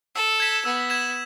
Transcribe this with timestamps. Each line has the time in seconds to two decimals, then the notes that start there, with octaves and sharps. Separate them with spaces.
0.15 A4 E6
0.40 G#6 B6 E7
0.65 B3 E6
0.90 G#6 B6 E7